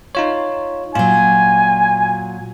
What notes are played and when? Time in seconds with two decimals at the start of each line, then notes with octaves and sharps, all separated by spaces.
0.15 D#4 F4 C#5
0.95 A#2 F#3 F4 G#5